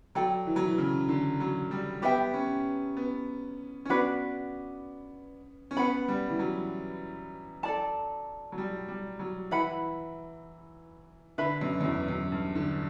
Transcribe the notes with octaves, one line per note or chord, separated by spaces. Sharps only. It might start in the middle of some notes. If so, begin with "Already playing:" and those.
F#3 A4 D5 G5
E3
F#3
E3
C#3
D3
F#3
G3
B3 G4 B4 E5 G5
C#4
B3
C#4
B3 D4 F#4 B4 D5
C#4
B3 B4 F#5 B5
G3
E3
F#3
A4 D5 A5
F#3
G3
G3
F#3
E3 E4 B4 F#5 B5
D3 B4 E5 B5
F#2
F#2
E2
F#2
G2
D3